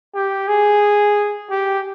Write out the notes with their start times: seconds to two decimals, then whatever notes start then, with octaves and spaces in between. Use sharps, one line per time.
0.14 G4
0.48 G#4
1.50 G4